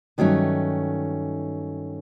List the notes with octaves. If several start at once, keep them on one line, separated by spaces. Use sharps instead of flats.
G2 D#3 F#3 A3 C#4